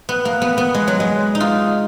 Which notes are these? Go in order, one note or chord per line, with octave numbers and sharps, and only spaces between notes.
B3
A#3
B3
B3
G#3
F#3
G#3
D#4
F4